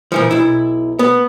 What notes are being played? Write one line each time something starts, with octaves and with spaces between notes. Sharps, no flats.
A#2 E3 F3
B1 E4
B3